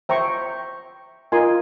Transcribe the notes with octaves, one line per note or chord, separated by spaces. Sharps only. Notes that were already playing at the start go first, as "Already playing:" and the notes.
C5 E5 G5 A#5 C#6
F4 A#4 D#5 G#5 C6